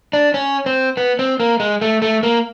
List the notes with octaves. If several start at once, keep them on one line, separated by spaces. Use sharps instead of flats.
D4
C#4
C4
B3
C4
A#3
G#3
A3
A3
A#3